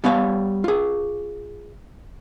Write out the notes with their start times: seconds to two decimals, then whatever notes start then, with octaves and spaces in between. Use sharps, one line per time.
0.04 G3 B3 C#5 F5
0.64 F4 G#4